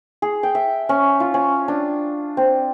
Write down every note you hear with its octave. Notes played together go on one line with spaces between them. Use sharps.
G#4
G5
E5
C#4
F4
C#4
D4
C4